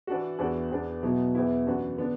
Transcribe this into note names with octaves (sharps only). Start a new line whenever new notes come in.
E3 D4 F#4
E2 E3 D4 F#4
E2 E3 B3 D4
B2 F#3 B3 E4
E2 E3 B3 E4
F#2 E3 D4 F#4
D3 B3 D4